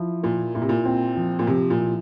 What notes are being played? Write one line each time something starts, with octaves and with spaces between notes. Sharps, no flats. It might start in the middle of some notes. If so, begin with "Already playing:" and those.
Already playing: F3 E4
A#2 A#3
A#2 E4
C3
A#2
C4
F3
A#2
C3 F3
A#2
E4